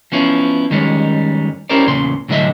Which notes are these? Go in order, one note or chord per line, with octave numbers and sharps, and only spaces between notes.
F3 B3 C#4 E4
F2 D#3 G3 G#3 C#4
C#4 E4 G4 A#4 C5 D5
E2 A#2 C#3 C6
C2 A2 D3 F#3 D#5 E5